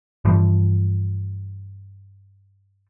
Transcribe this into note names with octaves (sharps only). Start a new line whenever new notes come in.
G2 E3 F3 G3